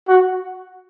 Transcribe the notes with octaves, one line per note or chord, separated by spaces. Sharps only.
F#4